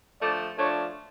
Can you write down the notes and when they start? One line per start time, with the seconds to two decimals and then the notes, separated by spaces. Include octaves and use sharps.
0.22 D3 F3 A3 D5
0.57 F3 A3 D4 C#5